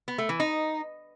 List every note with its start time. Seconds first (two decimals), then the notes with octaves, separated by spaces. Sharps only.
0.08 B3
0.18 A3
0.29 E3
0.40 D#4